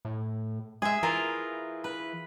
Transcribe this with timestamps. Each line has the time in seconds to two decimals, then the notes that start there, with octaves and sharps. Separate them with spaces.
0.05 A2
0.82 G#3 G#4 E5
1.03 E3 E4 F4 A#4
1.84 B4